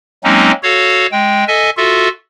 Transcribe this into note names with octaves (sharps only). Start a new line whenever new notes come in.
F#3 G#3 A#3 C4 C#4 D#4
F#4 A4 C#5 F5
G#3 G5
A4 D#5 E5 G#5
F4 F#4 A4 E5